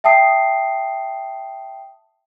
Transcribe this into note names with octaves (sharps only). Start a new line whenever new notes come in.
E5 G5 A5 D#6 C7